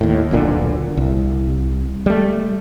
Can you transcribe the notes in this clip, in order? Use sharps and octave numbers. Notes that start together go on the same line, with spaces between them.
D#2 A2
D#1 B1 A#2 D3
C2
G3 A3